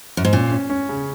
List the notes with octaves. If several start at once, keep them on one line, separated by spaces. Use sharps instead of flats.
F#2
G#2
A#2 C#4
C#4
C#4
C#3